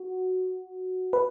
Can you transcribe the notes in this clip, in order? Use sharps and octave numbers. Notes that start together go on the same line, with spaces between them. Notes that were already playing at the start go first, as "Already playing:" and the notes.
Already playing: F#4
B4